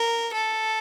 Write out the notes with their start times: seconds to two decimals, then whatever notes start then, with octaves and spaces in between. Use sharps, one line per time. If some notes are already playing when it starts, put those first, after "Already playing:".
Already playing: A#4
0.34 A4